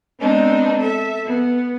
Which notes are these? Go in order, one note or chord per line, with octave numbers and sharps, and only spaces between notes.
G#3 B3 C4 D4 D#4
A4 E5
B3